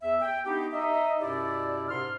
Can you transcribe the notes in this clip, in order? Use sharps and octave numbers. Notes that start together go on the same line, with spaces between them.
E2 E5
G5
B3 D4 D#4 G4
D#4 D#5 E5
F#2 B2 E4 G4 D5
G#2 C3 C6 F6